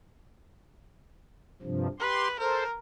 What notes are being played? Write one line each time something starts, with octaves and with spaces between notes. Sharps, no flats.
G2 C3 F3
G4 B4 C6
A4 A#4 C5